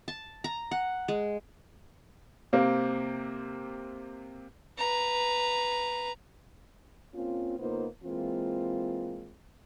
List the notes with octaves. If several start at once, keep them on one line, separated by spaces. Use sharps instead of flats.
A5
A#5
F#5
G#3
C3 A#3 C4
B4 A#5
A#3 C4 C#4 F4
C#3 A#3 B3 D#4 F4 C5
E3 G#3 A#3 C4 F4